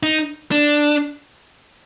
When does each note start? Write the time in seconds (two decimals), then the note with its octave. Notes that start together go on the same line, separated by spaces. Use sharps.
0.03 D#4
0.51 D4